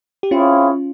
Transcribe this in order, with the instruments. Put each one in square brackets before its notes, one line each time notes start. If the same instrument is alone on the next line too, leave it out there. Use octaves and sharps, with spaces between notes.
[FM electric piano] G4
[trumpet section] C4 E4 G#4 C#5 F5 [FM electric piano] C#4 F4